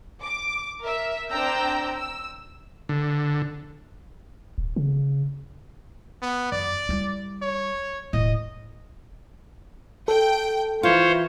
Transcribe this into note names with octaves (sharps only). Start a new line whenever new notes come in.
D6
A#4 E5
C4 D4 G5 A#5 E6 G6
E6
D3
D1
C#3
B3
F#2 D5
G3 E4
C#5
E1 A2 D#5
A4 G5
E3 F4 C5 C#5